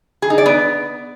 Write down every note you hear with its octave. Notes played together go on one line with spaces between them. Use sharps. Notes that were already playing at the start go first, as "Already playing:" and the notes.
G#4
D#4
D5
B3